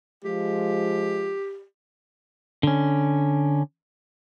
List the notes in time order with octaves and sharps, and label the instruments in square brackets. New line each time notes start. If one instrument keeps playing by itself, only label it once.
[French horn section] F3 G#3 F4 [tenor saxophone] G4
[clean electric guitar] D3 C#4